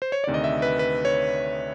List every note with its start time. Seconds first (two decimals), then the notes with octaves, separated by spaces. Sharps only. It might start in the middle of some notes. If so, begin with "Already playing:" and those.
0.02 C5
0.12 C#5
0.24 D2 C3 D#3 D5
0.34 D#5
0.44 E5
0.62 B4
0.79 B4
1.05 C#5